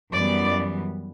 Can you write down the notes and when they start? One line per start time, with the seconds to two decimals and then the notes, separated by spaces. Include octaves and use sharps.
0.13 F#2 E3 G3 B3 D5